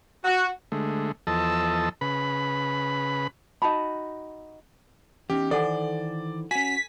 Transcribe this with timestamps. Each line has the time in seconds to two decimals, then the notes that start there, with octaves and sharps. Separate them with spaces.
0.25 F#4
0.72 D3 G#3 A3
1.27 E2 F3 A4 D#5 A5 E6
2.01 C#3 B4 B5
3.62 D#4 F#4 A5 B5
5.30 E2 C#4 D#4 G4
5.51 D#3 E3 A4 C5 D5 F#5 G#5
6.51 C#4 F#4 G#5 B6